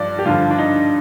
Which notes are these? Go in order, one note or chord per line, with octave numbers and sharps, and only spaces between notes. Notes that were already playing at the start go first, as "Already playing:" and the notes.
Already playing: G2 F3 D5
G4
G2 D3 F3 F4
D4
D#4